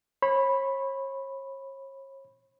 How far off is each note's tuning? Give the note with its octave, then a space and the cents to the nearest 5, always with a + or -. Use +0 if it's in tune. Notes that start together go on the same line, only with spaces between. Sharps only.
C#5 -40 B5 +0